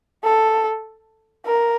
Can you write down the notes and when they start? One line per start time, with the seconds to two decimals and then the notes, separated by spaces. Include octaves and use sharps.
0.24 A4
1.46 A#4